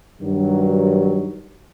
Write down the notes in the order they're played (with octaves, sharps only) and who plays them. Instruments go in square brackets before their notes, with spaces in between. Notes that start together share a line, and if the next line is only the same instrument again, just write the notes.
[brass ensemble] G2 D#3 F#3